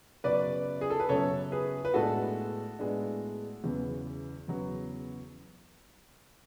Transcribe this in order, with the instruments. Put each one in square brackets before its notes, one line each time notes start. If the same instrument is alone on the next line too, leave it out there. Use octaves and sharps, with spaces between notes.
[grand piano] F#2 C#3 F#3 B3 F#4 [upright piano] B4 D5
[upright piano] G#4
A4
B4
[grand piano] F#2 C#3 F#3 B3 F#4 [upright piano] A4 C#5
[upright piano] G#4 B4
B4
[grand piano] A2 G#3 B3 D4 [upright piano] F#4 A4
[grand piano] A2 G#3 B3 D4
E2 C#3 F#3 B3
E2 C#3 F#3 B3